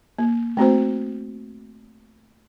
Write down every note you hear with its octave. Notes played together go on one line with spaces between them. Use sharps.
A#3
A3 C4 F#4 C5